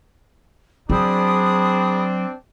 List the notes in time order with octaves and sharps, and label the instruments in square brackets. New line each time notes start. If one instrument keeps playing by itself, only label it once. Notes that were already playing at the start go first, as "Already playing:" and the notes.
[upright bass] F#3 [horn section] C4 D4 [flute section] G#4 B5 D#6